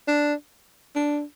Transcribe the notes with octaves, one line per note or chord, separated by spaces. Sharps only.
D4
D4